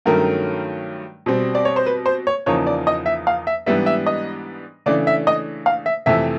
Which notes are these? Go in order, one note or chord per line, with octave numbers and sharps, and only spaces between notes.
G2 D#3 F#3 A3 C#4 A#4
B2 G3 C4
D5
C#5
C5
B4
C5
C#5
E2 C#3 F3 A#3 D#4 C#5
D5
D#5
E5
F5
E5
G#2 E3 G3 B3 D4 E5
E5
D#5
C#3 E3 A3 D4 D5
E5
D#5
F5
E5
F2 C3 E3 A3 E5